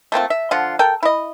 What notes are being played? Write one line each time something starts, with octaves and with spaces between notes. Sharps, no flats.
A3 A#3 C4 F4
E5
D3 F3 F4 F#5
A4 A#4 G5
E4 D#5